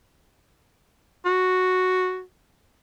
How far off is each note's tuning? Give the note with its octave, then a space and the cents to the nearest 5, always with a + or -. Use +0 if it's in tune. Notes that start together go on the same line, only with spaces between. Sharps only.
F#4 -5